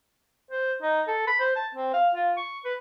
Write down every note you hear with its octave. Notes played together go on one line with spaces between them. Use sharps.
C5
D#4
A4
B5
C5
A5
C4
F5
F4
C#6
B4